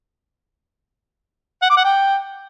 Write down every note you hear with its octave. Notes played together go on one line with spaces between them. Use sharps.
F#5
D6
F#5
G5